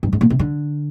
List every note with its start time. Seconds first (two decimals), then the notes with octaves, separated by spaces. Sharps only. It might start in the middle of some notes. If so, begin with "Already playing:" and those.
0.03 G2
0.13 G#2
0.21 A#2
0.30 C3
0.39 D3